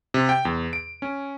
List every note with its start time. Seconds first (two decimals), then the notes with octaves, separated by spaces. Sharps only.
0.14 C3
0.29 G5
0.45 E2
0.73 D7
1.02 C#4